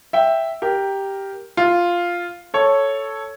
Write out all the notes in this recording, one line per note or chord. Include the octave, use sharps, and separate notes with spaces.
E5 G5
G4 A#4
F4
A4 C#5